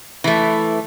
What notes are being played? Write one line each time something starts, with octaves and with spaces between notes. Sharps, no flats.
E3 A3